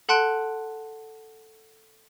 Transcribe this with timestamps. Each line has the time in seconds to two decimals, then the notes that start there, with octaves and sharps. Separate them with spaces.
0.09 A4 F#5 A5 C6 F#6 D7